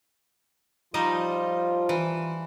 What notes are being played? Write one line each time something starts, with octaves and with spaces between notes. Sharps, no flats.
F3 G3 D#4 F4 D#5
E3